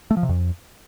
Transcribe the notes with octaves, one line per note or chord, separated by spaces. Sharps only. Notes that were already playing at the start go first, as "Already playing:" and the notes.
A3
F3
C3
F2